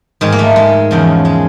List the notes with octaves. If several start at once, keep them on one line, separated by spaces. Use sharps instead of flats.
G#2 D#3 G#3
A#3
A3
G#3
E2 C#3 F3
G#3